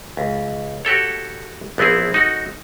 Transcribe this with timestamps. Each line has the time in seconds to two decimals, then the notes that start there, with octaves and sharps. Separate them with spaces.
0.17 C#2
0.85 F#4 G4 A4 C#5
1.78 A#1 B3 C4 E4 G#4
2.14 D#4 F#4 A4